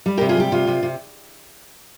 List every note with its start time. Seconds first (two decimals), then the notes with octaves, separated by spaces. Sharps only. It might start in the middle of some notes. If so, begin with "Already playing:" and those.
0.06 G3
0.17 C3 G4 A#4
0.29 F4 G#4
0.37 G3 G4
0.52 C3 F4
0.67 C3
0.83 C3